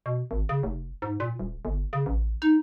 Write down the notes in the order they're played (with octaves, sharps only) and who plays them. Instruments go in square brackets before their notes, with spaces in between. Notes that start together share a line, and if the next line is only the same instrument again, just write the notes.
[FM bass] B2
G#1
C#3
F1
G#2
A#2
D#1
G1
C#3
A1
D#4